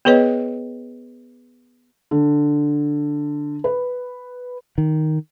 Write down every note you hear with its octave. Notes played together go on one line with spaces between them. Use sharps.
B3 G#4 B4 C#5 D#5
D3
B4
D#3